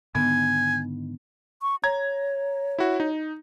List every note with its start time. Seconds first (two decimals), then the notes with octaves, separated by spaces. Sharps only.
0.15 G#2 D3 D#3 B3 G#5
1.62 C#6
1.84 C#5 A#5 G#6
2.79 E4 F#4
3.00 D#4